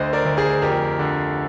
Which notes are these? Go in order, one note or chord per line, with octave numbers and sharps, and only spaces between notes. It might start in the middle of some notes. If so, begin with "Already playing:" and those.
Already playing: D2 D3 C5 D#5
A#4 D5
D2
G#4 C5
F2 G4 A#4
D3